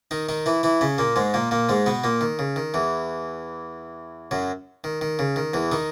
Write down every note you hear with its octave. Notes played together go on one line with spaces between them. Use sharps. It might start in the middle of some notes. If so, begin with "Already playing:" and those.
D#3 D#4
D#3 D#4
E3 E4
E3 E4
C#3 C#4
A#2 A#3
G#2 G#3
A#2 A#3
A#2 A#3
G#2 G#3
B2 B3
A#2 A#3
D#3
C#3
D#3
E2 E3
F#2 F#3
D#3
D#3
C#3
D#3
E2 E3
D#3 D#4